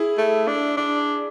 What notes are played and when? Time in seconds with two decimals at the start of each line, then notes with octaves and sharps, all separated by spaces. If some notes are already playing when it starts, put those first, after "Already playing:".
Already playing: E4 G#4
0.18 A3
0.48 D4
0.77 D4